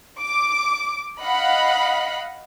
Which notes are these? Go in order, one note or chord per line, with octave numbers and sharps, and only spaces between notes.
D6
D#5 F5 F#5 B5